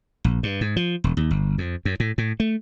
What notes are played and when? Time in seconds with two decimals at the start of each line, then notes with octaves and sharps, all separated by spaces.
0.24 A#1
0.43 G2
0.61 G#2
0.76 F3
1.04 E1
1.17 D#2
1.31 G1
1.58 F2
1.85 F#2
2.00 A2
2.18 A2
2.40 A3